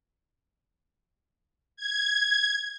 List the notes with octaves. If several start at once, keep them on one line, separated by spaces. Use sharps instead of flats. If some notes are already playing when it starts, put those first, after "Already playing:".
G#6